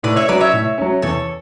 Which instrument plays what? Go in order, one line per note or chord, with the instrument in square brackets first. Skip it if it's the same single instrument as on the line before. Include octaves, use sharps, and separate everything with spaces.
[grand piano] A2 [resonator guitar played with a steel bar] B4 D5
[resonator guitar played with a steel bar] C#5 E5
[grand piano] F#3 C#4 [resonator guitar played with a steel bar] B4 D5
[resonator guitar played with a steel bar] C#5 E5
[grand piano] A2
F#3 C#4
[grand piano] E2 [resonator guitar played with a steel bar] A4 C#5